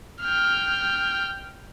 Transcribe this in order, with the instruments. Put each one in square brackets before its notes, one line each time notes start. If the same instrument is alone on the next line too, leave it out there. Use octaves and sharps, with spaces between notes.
[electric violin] G5 F6